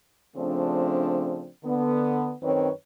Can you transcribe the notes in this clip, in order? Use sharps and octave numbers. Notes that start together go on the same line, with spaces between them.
C#3 F3 A3 C4 D4
D3 B3
F#2 D#3 C4 B4 C#5